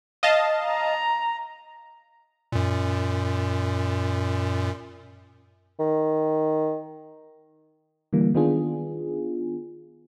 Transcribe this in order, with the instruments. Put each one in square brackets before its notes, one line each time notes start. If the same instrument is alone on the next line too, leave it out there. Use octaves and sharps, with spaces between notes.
[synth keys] D#5 F5 A5
[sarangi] A#5
[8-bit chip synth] F#2 A#2
[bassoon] D#3
[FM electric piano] D3 E3 G3 A#3
D#3 B3 D4 F4 G#4